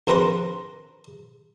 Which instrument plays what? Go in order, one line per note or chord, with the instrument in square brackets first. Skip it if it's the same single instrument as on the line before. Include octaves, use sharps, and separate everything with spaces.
[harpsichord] A#1 C4 A#4 B4 A#5 C6